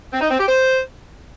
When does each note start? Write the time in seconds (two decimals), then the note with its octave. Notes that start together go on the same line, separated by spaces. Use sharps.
0.12 C4
0.21 D#4
0.30 C4
0.39 G4
0.48 C5